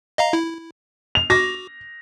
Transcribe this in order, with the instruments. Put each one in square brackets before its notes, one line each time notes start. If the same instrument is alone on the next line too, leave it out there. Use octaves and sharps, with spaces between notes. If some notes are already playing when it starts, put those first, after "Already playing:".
[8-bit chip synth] D#5 F5 A#5
E4
[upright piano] F7
[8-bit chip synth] F#4 D6 [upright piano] A#6